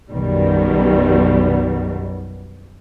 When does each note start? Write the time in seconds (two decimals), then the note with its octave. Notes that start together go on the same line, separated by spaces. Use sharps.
0.11 B1 F#2 B2 D#3 G3